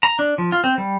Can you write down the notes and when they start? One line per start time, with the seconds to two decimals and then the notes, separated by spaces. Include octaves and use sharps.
0.03 A#5
0.19 D4
0.38 F3
0.52 F4
0.64 C4
0.78 G3